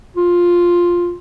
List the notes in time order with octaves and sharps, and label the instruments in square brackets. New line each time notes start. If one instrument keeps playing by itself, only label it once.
[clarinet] F4